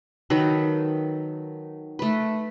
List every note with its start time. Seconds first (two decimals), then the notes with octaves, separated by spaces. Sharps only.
0.30 D#3 F#3 A4 B4
1.99 A3 B4